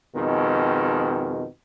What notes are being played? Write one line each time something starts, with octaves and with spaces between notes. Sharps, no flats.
F2 B2 D#3 G#3